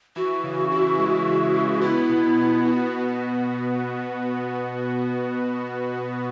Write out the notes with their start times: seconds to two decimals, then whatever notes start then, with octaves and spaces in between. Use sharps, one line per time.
0.16 E3 F#4
0.44 C#3
0.72 E4
0.99 G#3
1.27 E3
1.55 C#3
1.81 B3 E4
2.09 B2
2.37 B2
2.65 F#4
2.93 B3
3.20 B2